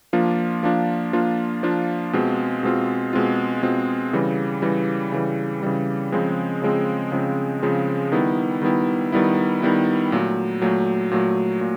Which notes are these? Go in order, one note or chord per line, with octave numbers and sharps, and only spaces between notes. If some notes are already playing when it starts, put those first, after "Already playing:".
F3 A#3 D4 F4
F3 A#3 D4 F4
F3 A#3 D4 F4
F3 A#3 D4 F4
B2 G#3 C4 F4
B2 G#3 C4 F4
B2 G#3 C4 F4
B2 G#3 C4 F4
C#3 E3 G3
C#3 E3 G3
C#3 E3 G3
C#3 E3 G3
C#3 F3 G#3 C4
C#3 F3 G#3 C4
C#3 F3 G#3 C4
C#3 F3 G#3 C4
D#3 G3 B3 E4
D#3 G3 B3 E4
D#3 G3 B3 E4
D#3 G3 B3 E4
A#2 F#3 A3
A#2 F#3 A3
A#2 F#3 A3
A#2